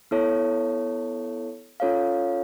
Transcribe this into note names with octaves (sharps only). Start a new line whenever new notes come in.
B3 E4 A4 C#5
C#4 F4 A4 C#5 F5